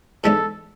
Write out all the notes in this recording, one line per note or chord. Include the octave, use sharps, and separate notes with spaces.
G#2 E3 G#3 B3 D4 A4